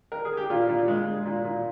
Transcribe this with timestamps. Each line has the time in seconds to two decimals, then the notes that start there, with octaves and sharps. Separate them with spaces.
0.12 A#4
0.25 G#4
0.37 G4
0.50 A#2 F4
0.69 A#2
0.78 F4
0.88 G#3
1.07 G#3
1.25 A#2
1.45 A#2